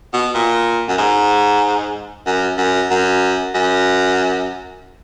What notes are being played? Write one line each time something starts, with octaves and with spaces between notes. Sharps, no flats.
B2
A#2
F#2
G#2
F#2
F#2
F#2
F#2